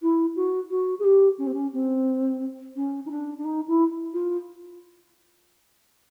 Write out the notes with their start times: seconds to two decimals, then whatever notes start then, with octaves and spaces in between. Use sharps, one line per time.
0.02 E4
0.36 F#4
0.70 F#4
0.99 G#4
1.04 G4
1.38 C#4
1.46 C4
1.54 C#4
1.73 C4
2.76 C#4
3.05 D#4
3.10 D4
3.38 D4
3.44 D#4
3.68 E4
4.13 F4